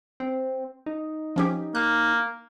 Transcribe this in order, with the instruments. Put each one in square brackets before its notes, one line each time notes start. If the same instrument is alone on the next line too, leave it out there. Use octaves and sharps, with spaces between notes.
[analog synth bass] C4
D#4
[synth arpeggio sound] F3 C#4 G4
[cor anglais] A#3 [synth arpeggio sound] F#6